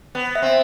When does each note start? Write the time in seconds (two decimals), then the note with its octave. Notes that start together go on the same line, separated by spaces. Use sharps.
0.15 B3
0.35 E5
0.42 C4